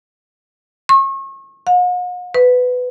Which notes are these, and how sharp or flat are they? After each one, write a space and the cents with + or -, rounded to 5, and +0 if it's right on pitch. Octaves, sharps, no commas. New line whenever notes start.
C#6 -35
F#5 -45
B4 +15